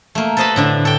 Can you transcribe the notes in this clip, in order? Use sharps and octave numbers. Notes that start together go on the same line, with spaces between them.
A3 A#3
A4 B4 C5 D#5 A5 B5
A2 D3 D4
A4 G5